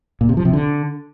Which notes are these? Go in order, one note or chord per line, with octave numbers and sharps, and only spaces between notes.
A#2
C3
F3
C3
D3